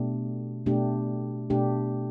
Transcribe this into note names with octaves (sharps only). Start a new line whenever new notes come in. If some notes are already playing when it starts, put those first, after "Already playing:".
Already playing: B2 A3 D4 G4
B2 A3 D4 G4
B2 A3 D4 G4